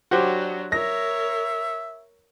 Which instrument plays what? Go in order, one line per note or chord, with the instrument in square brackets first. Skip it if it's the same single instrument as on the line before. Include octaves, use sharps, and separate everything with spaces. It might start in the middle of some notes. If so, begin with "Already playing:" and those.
[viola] F#3 D4 [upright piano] F#4 G4 C5
[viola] A#4 C#5 [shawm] E5 [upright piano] A#6